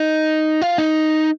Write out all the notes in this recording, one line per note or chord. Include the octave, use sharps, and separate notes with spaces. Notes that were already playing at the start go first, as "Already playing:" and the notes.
Already playing: D#4
F4
D#4